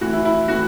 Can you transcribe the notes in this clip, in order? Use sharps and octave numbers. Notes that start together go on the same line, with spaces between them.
A2 E3 F#4
E4
E4
A2 E3 F#4